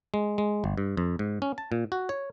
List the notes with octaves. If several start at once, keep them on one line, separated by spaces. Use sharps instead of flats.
G#3
G#3
G1
G2
F2
G#2
C#4
A5
A#2
F#4
C#5